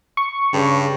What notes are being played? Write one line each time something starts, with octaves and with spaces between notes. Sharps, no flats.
C#6
G2 C#3